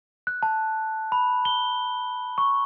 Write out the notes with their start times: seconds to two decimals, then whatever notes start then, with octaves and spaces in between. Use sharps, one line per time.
0.27 F#6
0.43 A5
1.12 B5
1.45 G7
2.38 C#6